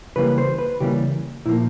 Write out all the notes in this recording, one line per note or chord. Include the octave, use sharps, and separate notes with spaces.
C#3 E3 G3 A#3 B4
C5
B4
C#3 E3 G3 A#3 G4
A#2 F3 A#3 E4